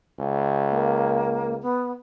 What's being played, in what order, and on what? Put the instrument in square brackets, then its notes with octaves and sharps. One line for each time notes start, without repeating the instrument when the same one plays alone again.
[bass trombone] C#2
[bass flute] A#3
B3